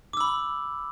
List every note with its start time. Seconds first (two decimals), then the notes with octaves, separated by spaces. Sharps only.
0.13 D6
0.17 E6
0.21 B5